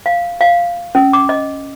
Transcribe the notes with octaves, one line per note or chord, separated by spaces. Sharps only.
F5
F5
C#4
D6
D#5